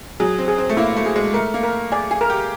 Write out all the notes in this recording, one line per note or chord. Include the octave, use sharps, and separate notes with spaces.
F#3 G#4
C4
G#4
C4
A3
A#3 E4
A3
G#4
G#3
A3 A#4
A#3
A#4
G#4 D5
G#4
A#4
G4